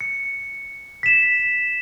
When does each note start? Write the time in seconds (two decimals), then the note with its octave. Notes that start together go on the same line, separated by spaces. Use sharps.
0.01 C#7
1.03 B6 E7